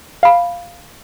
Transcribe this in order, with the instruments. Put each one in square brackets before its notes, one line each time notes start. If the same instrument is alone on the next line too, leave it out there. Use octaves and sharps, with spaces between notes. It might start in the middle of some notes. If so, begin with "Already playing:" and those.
[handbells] F5 B5